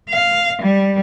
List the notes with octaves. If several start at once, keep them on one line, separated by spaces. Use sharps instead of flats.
F5
G3